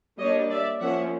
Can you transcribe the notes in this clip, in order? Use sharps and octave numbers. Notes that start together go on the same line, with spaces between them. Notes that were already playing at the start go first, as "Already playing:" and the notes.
G3 A#3 D4 C#5 D#5
D5 E5
F3 A#3 C#4 E5 F#5